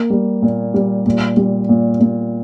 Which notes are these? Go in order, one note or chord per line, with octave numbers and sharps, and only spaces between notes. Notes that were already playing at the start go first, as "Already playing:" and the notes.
Already playing: A#3
G3
A#2
G3
A#2
G3
A#2
A#2